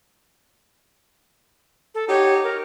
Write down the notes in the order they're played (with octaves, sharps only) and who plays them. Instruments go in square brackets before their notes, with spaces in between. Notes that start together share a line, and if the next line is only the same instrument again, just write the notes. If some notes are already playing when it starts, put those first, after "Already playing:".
[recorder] A4
[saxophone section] D#4 F#4 G4 [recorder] C#5
[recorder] A#4